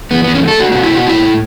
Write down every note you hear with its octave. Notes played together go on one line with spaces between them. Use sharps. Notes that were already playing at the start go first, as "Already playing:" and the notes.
E2 B3
E2 B3
C#4
A3 A4
A3 F#4
B2 F#4
E4
B2 F#4
A2 E4
A2